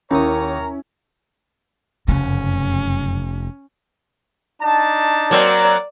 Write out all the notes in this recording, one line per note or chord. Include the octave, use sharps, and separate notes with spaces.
D#2 C#4 E4 A#4 C#5 A#5 C#6 D#6
F1 F#2 C#3 C#4
D4 D#4 A5
F#3 A#3 C4 D5